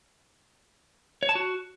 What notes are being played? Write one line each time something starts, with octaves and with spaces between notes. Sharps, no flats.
C#5
A5
F#4